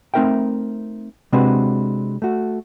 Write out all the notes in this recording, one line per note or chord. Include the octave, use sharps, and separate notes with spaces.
A3 C4 D#4 A#4 E5 G5
C3 G#3 C4 D4 F#4 B4
A3 F#4